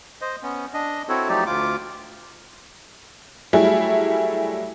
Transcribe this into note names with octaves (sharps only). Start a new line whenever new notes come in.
C5 D#5
B3 C#4
D4 D#5
C4 E4 F#4 A4 C#5
F3 F#3 A3 D#4 G4 D5
D2 F4 D6
F#3 G3 A3 E4 G#4